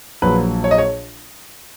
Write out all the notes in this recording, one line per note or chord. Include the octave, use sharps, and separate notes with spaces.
A#1 A#2 F#3 B4
C#5
D#5
C#5